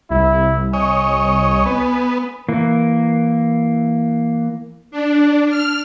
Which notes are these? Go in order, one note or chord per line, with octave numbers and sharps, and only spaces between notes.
C2 E4
C#5 D#5 G#5
B3
E3 A#3
D4
F6